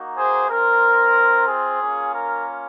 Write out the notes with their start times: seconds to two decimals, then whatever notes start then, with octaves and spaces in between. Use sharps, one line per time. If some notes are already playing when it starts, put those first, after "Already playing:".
Already playing: A#3 D#4 F#4
0.16 G#4 C5
0.49 C4 F4 A#4
1.47 G#4
1.80 A#3 C#4 F4
2.13 A#4